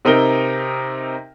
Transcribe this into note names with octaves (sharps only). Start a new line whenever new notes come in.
C3 C4 D#4 A#4 G7